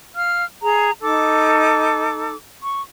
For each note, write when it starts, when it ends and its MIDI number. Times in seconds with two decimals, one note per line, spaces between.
0.15 0.44 77
0.15 0.44 89
0.61 0.91 68
0.61 0.91 82
1.01 2.35 63
1.01 2.35 69
1.01 2.35 86
2.62 2.83 85